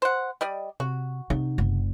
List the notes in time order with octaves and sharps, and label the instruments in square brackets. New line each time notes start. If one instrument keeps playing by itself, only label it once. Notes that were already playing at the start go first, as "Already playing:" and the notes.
[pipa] C5 F#5
G3 D5 D#5
[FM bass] C3 [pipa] F#4
[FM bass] C3 [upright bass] D#4
[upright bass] F#1